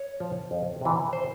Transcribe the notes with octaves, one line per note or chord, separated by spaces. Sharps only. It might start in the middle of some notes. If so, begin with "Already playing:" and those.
Already playing: C#5
F3
F2
C3 E3
C5